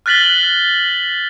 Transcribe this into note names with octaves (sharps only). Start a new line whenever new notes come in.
F6 F#6 A6 B6 F#7 G7